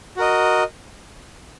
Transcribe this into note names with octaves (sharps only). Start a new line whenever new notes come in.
F#4 A#4 D#5